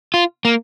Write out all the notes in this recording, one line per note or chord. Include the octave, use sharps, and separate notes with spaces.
F4
A#3